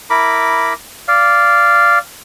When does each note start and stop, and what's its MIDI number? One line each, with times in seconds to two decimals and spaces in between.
0.10 0.74 64
0.10 0.74 70
0.10 0.74 83
0.10 0.74 86
1.08 1.99 74
1.08 1.99 77